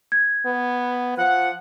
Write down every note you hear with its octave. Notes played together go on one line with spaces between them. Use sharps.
G#6
B3
F3 F#5